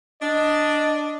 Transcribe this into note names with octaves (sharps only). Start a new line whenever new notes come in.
D4 D#5